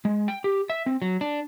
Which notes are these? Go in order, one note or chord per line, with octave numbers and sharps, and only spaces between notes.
G#3
G5
G4
E5
C4
F#3
D4